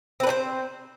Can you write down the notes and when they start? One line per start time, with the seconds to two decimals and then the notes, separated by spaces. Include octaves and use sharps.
0.20 C4
0.23 B4
0.27 D4
0.30 C5